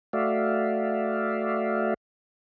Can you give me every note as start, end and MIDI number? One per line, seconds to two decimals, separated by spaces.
0.13 1.94 57
0.13 1.94 66
0.13 1.94 74
0.13 1.94 76
0.13 1.94 77